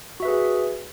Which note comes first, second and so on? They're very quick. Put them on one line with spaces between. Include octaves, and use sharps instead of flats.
F#4 E5 B4 G#4